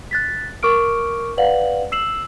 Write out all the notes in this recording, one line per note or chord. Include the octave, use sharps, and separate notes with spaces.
F#6 A6 B6
A#4 C#6 D6 F6 D7
B4 D5 F5 F#5 F#7
E6 C7 E7 F#7